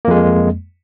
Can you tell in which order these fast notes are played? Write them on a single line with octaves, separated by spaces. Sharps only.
A#3 F2 G#3